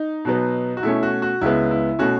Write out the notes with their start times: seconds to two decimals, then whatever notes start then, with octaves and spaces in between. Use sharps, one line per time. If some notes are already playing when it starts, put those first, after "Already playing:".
Already playing: D#4
0.25 B2 F#3 B3
0.77 F#4
0.83 B2 A3 C#4 E4
1.03 F#4
1.22 F#4
1.41 C#2 C#3 G#3 B3 E4
1.71 E4
1.99 B2 A3 C#4 F#4